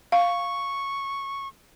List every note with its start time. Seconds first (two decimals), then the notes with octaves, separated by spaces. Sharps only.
0.12 F5 C#6